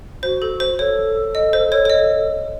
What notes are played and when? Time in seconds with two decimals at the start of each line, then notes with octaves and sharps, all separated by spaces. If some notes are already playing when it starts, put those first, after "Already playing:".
0.23 F#4 C5
0.42 A4
0.60 C5
0.79 A4 C#5
1.35 D#5
1.53 C5
1.72 C#5
1.85 C#5
1.90 D#5